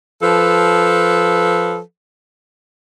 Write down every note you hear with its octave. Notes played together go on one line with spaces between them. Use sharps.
F3 A4 B4